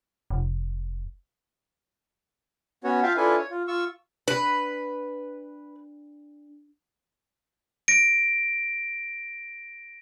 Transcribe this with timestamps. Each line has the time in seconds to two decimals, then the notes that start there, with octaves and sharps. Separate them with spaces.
0.30 F1
2.84 B3 C#4 F#4 C#5
3.03 F4 E5 F5 G5 A5
3.17 D4 E4 F4 A4 B4 G#5
3.38 C#5
3.50 F4
3.68 F4 C#6 E6
4.28 D4 B4
7.88 A#6 D7